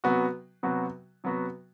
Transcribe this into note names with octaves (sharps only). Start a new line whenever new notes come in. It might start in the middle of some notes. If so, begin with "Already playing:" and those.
C3 F#3 B3 F#4
C3 F#3 B3 F#4
C3 F#3 B3 F#4